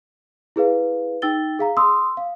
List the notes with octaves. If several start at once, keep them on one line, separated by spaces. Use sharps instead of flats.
E4 G#4 B4 F5
D#4 G5 E6 A6 G7
G#4 F5 A#5
C6 D#6 E6
F5